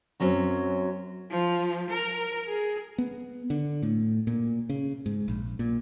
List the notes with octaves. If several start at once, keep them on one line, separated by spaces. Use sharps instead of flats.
F#2 F#3 C4 C#4
F3
A#4
G#4
B3
D3
A2
A#2
C#3
G#2
A#1
A#2